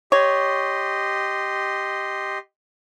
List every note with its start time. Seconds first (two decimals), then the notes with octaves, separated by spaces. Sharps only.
0.12 G4 C#5 D#5 C6